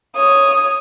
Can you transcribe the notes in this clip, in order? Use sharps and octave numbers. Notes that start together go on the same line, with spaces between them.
C#5 D#6